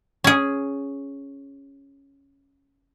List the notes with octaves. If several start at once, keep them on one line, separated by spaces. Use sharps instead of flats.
C#4 G#4